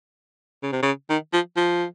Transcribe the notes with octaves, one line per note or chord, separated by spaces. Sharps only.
C#3
C3
C#3
D#3
F3
F3